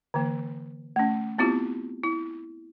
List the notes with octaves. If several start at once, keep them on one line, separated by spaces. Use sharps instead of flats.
D3 E3 A#3
A3 C#4
B3 C4 E4 F4 G4
E4